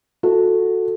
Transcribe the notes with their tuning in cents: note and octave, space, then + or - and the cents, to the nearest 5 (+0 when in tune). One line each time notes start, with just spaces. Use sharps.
F#4 -15 A4 +0